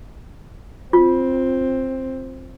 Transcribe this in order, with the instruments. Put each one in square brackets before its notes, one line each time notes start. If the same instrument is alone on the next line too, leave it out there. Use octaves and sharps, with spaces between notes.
[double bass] C4 [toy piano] F4